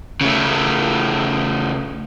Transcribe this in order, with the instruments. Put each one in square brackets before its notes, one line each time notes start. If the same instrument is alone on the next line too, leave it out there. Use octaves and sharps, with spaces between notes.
[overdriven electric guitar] C#3 A3